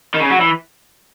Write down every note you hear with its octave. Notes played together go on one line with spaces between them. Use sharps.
D#3
C#3
F#3
E3